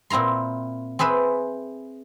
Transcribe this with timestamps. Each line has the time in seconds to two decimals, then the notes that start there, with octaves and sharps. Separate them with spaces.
0.10 A#2 C4 E4 A#5 C6
0.99 C4 G#4 B4 E5 B5